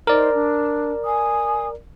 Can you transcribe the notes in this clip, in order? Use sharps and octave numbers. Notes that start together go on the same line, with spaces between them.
D#4 A#4 C5 D5
D4
G#5 D#6